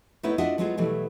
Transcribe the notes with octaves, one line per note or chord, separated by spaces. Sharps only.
A3 B3 D#4 E4 B4 C#5
D4 F4 F#4 D#5 E5 F#5
F#3 G#3 B3 F4 F#4 G#4
B2 E3 F#3 G3 A3